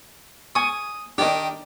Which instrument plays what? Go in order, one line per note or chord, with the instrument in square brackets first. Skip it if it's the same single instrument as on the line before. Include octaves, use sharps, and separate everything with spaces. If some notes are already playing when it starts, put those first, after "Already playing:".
[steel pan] G#5 C#6 [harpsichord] D#6
[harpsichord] D#3 G4 [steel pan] D4